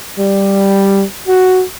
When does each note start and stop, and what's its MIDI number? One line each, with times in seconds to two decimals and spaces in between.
0.18 1.03 55
1.28 1.63 66